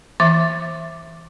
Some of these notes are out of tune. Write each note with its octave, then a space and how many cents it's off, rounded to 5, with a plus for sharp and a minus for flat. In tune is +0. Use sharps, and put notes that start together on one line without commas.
E3 +0 E5 +0 D6 +0